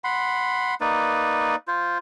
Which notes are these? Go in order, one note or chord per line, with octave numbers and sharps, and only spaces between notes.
F#5 B5 C6
A#3 D#4 B4 D5
F4 C5